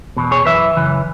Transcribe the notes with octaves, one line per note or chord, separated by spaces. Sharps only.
E2 B2
G#4 C#5
F#2 E3 B4 E5
F#2 C#3 E3